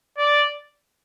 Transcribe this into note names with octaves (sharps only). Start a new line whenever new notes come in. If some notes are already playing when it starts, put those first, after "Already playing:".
D5